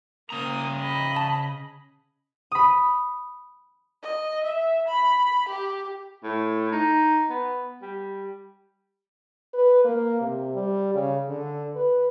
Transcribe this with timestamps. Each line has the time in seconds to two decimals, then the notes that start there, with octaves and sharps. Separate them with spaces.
0.30 C#3 A#3 A#5 D#6
0.77 D#5 B5
1.16 A5
2.52 B5 D#6
4.03 D#5
4.43 E5
4.87 B5
5.48 G4
6.23 A2
6.72 D#4
7.29 B3
7.82 G3
9.54 B4
9.84 A#3
10.21 C3
10.54 G3
10.94 C#3
11.29 D3
11.76 B4